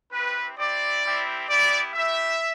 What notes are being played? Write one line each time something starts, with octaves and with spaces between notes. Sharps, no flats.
C4 E4 G4 B4
C4 E4 G4 D5
G3 C4 E4 G4
B3 E4 G4 D5
A3 E4 G4 E5